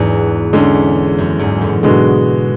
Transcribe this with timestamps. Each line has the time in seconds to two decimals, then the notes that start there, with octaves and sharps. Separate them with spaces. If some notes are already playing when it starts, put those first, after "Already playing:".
Already playing: E2 G#2 F#3 B3 D4 F#4
0.53 E2 D3 G#3 C#4
1.18 F#2
1.39 E2 G#2
1.61 F#2 A2
1.83 G#2 B2 D3 G#3 B3 F#4